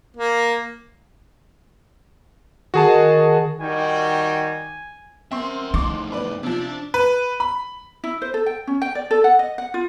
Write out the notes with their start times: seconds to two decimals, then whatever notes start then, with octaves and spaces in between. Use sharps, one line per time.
0.16 A#3
2.74 D#3 F#4 G#4 A5
3.60 D#3 G3 F#4 G5 G#5
5.32 C4 A#4 E5 C6
5.74 F2 A2 D#4 C6 D6
6.12 B4 D5
6.43 C3 F3 D4
6.94 B4
7.40 B5
8.04 E4
8.22 C5
8.34 A4
8.46 G5
8.67 C#4
8.82 G5
8.95 D5
9.11 A4
9.24 F#5
9.39 D#5
9.58 F#5
9.74 F4